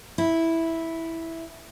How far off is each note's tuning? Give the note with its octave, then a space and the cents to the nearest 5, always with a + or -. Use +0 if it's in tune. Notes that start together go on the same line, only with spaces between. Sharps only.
E4 -5